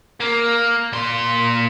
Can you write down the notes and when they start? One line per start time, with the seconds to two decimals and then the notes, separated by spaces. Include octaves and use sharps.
0.20 A#3
0.93 A#2 C6